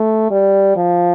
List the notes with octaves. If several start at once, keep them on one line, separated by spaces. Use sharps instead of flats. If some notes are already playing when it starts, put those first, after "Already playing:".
Already playing: A3
G3
F3